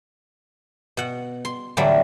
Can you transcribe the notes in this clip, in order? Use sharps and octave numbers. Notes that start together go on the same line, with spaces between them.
B2 F#5
C6
A2 D3 E3 F#3 G3 D4